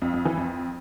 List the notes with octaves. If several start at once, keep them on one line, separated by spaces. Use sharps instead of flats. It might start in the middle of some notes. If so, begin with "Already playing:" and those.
F2
F2
E3
F2